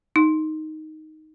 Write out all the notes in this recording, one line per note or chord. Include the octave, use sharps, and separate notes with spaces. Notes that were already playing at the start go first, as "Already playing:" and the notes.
D#4